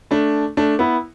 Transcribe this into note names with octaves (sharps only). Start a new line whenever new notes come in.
A3 D4
A3 D4
B3 E4